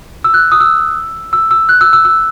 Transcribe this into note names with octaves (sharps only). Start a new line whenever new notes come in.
E6
F#6
D#6
E6
E6
E6
F#6
E6
E6
E6